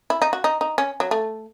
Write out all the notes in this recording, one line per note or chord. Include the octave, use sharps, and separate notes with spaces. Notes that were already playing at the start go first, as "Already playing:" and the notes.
E4
D#4
F#4
D#4
D#4
C#4
F#3
A3